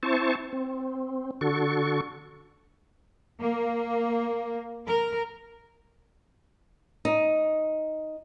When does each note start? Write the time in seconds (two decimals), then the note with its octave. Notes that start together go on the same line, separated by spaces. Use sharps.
0.03 C4 E4 C5 A5 C#6
0.53 C4
1.41 D3 F#4 A4 C#6
3.41 A#3
4.85 A#4
7.05 D#4